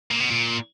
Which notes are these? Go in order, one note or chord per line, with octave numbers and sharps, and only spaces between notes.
A#2
B2
A#2